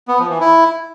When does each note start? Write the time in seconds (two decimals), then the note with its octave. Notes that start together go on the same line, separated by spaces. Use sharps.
0.08 B3
0.19 F3
0.30 E3
0.41 E4